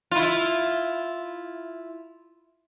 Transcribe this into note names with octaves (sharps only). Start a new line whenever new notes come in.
E4 F4